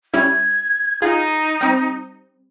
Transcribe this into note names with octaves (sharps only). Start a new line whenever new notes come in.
G3 C#4 E4 G#6
D#4 F4 G#4
G3 C4